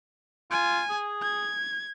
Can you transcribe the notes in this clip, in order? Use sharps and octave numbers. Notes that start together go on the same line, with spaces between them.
F4 G#5
G#4
G#6